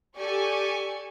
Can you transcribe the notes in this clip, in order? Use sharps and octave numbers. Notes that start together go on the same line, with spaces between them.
G4 A4 D5 G#5 C#6